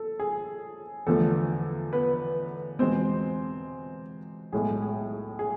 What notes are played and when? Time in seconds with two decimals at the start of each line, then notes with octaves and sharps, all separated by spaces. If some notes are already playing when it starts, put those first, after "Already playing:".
Already playing: A4
0.20 G#4
1.07 E2 D3 F3 A3 A4
1.93 B3 B4
2.79 E2 B2 G#3 C4 C5
4.52 B1 A2 G#3 G#4
4.82 G#4
5.39 G#4